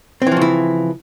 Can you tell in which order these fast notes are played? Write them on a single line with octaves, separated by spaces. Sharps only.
C4 E3 F3 C#3 E4